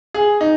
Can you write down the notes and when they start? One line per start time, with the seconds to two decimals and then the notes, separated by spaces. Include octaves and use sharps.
0.14 G#4
0.41 D#4